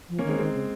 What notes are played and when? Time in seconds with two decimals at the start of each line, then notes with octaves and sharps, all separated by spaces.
0.09 F3
0.18 A#3 C#4
0.24 D#3 G#3 C4
0.39 D#3 G#3 C4
0.54 C#3